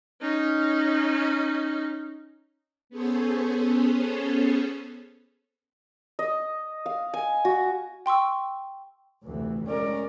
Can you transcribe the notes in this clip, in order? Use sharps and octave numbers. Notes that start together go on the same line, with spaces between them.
C#4 D#4
B3 C#4 G#4 A4 C5 C#5
D#5
F5
G#5
F#4
G5 C6 C#6 E6
F1 D2 E3
G#3 C#4 A#4 D5